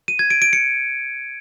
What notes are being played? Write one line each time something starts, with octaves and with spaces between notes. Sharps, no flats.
D#7
G#6
D7
D7
C#7